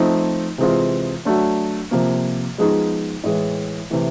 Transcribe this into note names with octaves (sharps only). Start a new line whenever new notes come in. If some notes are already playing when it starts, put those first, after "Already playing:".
Already playing: F3 A3 C4 D#4
C3 E3 G#3 C4 F4
F#3 A3 D4
C3 F3 A#3
F3 G#3 B3 D#4 G#4
A2 E3 G#3
C3 E3 A3